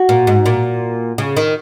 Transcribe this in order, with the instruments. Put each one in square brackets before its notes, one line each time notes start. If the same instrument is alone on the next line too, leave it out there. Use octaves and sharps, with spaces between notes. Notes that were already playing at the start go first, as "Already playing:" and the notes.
Already playing: [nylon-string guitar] F#4
[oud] A#2
G#2
A#2
C#3
D#3